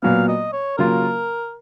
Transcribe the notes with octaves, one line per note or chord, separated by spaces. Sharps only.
A#2 F#3 B3 F5
D#5
C#5
C#3 F#3 A#3 F4 A#4